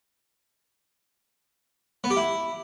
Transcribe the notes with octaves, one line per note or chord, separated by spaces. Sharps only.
B3
G4
E4